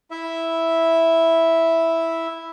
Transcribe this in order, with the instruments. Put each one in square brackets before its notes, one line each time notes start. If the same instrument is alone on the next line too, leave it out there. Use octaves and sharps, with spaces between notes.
[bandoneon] E4 E5